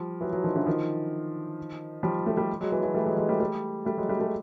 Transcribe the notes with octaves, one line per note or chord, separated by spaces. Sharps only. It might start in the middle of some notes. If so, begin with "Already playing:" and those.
Already playing: F3 G3
E3 F#3
E3 F#3
D#3 F3
D3 E3
D#3 F3
F3 G3
G3 A3
G3 A3
F#3 G#3
E3 F#3
E3 F#3
G3 A3
F#3 G#3
F#3 G#3
G3 A3
G3 A3
G3 A3
F#3 G#3
G3 A3
G3 A3